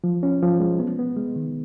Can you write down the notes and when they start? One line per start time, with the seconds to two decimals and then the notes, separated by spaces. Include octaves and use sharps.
0.04 F3
0.23 C#4
0.42 F3
0.60 G#3
0.79 B3
0.99 B3
1.17 G#3
1.36 D#3